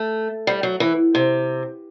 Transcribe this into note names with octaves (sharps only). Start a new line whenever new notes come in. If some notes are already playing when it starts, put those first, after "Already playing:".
Already playing: A3
G3
F#3
E3
C3